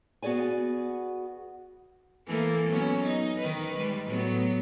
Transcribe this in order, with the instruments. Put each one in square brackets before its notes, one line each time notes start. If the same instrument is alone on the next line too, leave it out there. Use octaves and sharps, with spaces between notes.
[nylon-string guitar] B3 F#4 G#4 D5 G#5
[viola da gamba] E3 A#3 A4
F#3 B3 C#4
D#4
D#3 B4
G3 G#3
A2 F#3 B3